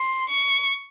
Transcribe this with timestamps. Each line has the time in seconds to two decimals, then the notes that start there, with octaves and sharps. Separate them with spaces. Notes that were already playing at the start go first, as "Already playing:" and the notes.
Already playing: C6
0.29 C#6